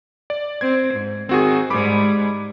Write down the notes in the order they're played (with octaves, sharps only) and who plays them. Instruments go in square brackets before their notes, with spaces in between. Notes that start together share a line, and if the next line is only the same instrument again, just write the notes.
[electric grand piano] D5
[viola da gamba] C4 [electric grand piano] G#6
[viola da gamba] G#2
[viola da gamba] D#3 [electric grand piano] C4 F#4 G#4
[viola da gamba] G#2 G3 G#3 [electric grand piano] B5 D6